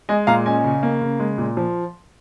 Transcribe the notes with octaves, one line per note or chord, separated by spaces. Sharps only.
G#3 D#5 G#5
A#2 F5 A#5
C#4 D#5 G#5
C#3
A#3
C#3
G#3
A#2
F3